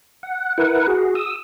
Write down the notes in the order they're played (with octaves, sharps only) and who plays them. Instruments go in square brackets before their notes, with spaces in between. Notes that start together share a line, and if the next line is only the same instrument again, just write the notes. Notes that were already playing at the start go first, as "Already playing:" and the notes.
[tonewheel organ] F#5
E4 A#4 B4 F#5
F#4 G#4
D#6 E6